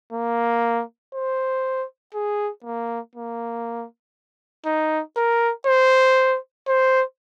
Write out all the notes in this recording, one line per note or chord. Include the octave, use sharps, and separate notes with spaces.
A#3
C5
G#4
A#3
A#3
D#4
A#4
C5
C5